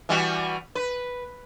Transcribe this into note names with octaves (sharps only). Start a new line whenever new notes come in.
E3 G3 F#4
B4